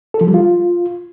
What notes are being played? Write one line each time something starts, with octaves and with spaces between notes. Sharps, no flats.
A4
F3
G3
F4